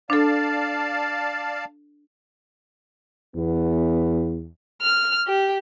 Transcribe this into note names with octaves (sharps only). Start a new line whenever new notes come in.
D4 A4 D5 F5 A5
E2 B3
F6
G4